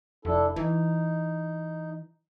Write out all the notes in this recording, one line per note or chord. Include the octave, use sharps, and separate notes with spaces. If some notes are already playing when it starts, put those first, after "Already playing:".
F1 D4 E4 A4
E3 D#4